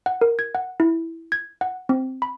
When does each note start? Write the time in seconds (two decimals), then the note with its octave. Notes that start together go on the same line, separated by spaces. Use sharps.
0.06 F#5
0.21 A#4
0.39 G#6
0.55 F#5
0.80 E4
1.32 G#6
1.61 F#5
1.89 C4
2.22 B5